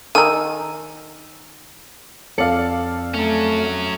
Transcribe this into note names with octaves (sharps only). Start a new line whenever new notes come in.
D#3 D#4 G#5 E6
F2 A4 D5 F5 C#7 F#7
F#3 A3 C#4